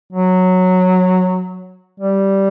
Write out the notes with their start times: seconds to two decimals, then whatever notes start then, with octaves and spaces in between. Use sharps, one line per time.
0.13 F#3
2.00 G3